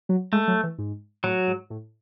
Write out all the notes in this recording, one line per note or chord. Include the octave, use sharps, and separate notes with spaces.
F#3
G#3 A3
F#3
E3
G#2
A2 F#3
G#2
A2